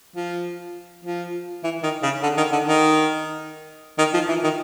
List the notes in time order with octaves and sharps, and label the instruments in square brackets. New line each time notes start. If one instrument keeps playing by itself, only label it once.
[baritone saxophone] F3
F3
E3
D#3
C#3
D3
D#3
D3
D#3
D#3
F3
E3
D#3